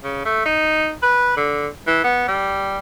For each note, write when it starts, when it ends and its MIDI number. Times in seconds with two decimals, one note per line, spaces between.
0.04 0.21 49
0.25 0.43 57
0.45 0.92 63
1.03 1.34 71
1.37 1.67 50
1.87 2.01 52
2.04 2.26 59
2.28 2.78 55